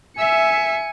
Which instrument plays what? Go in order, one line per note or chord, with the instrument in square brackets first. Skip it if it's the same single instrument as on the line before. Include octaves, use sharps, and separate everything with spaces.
[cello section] E5 [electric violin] G#5 C#7